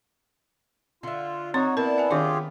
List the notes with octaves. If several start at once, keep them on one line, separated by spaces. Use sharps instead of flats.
D3 F4 E5
C4 D#4 F#4 C#5 C6
A#3 B3 D4 E4 A#4 A5
E5 G#5
D#3 B3 D4 F4 G4 G#4